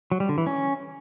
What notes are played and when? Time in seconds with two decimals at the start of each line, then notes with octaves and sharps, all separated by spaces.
0.12 F#3
0.20 G3
0.29 D3
0.38 E3
0.47 C#4